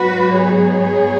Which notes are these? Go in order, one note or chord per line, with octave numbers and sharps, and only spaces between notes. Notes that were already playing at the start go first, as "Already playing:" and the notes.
Already playing: G#2 F#3 B3 D#4 F#4 B4
G#4 C#5